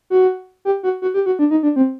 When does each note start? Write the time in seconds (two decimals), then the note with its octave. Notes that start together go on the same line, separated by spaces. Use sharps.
0.10 F#4
0.65 G4
0.83 F#4
1.02 F#4
1.14 G4
1.26 F#4
1.39 D4
1.51 D#4
1.63 D4
1.76 C4